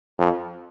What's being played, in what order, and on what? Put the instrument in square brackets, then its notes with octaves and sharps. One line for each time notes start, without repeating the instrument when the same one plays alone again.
[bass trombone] F2